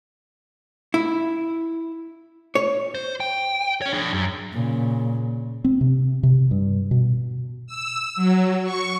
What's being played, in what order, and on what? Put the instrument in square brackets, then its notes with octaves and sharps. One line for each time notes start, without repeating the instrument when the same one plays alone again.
[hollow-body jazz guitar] E4
C#5
[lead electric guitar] C5
G5
C#4 C#5
D4 G#4
F#2
[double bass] A#2 C#3
[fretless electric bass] C4
C3
C3
G2
B2
[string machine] E6
F#3
C#6